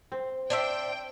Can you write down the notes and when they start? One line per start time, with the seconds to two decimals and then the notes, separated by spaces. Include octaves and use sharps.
0.12 C4
0.50 D4 C5 E5 G5